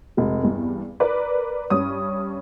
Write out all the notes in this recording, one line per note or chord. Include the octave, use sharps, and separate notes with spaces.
F1 G#3
E2 G2
A#4 B4 D5
G2 C#4 D#6